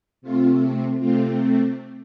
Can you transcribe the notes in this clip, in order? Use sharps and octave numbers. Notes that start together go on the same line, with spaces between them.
C3 A3 C4 F4
C3 A3 C4 F4